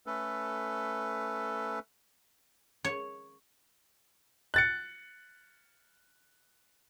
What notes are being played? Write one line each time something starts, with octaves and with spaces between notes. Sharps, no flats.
A3 C#4 A4 B4
C#5
F#6 A6 C#7